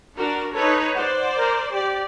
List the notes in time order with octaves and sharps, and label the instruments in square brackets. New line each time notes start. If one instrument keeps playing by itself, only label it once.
[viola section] D4 F#4 A#4
[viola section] D#4 B4 C#5 [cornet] A4
[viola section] C5 D5 [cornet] F#5
[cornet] A#4
[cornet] G4 [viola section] D5